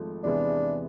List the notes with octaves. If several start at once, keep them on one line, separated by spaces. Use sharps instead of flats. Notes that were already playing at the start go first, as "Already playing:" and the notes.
Already playing: G#1 G#2 F3 A3
E2 C3 E3 G#3 B3 D4